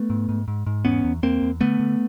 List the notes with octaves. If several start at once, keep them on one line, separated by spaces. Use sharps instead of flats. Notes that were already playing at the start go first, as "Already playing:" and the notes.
Already playing: A3 B3
G#2
G#2
G#2
G#2
E2 B3 C#4
E2
E2 A#3 C4
E2
D3 A3 B3
D3